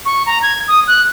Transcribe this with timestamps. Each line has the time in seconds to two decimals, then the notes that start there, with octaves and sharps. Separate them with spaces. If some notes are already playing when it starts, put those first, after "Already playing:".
0.06 C#6
0.26 A#5
0.42 G#6
0.68 D#6
0.88 F#6